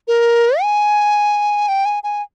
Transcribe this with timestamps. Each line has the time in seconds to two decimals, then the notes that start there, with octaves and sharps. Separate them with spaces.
0.08 A#4
0.61 G#5
1.68 G5
1.85 G#5
2.03 G#5